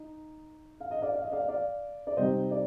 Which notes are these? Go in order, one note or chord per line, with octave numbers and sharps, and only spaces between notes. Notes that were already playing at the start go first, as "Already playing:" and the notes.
Already playing: D#4
F5
D#5
D5 F5
F5
D#5
D5 F5
D5 F5
D5
C3 G3 C4 D#4 C5 D#5
D5